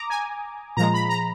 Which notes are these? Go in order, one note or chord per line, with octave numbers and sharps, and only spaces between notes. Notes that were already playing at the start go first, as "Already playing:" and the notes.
Already playing: A#5 D6 D#6
G#5
A#2 F3 G#3 A#5
B5
A#5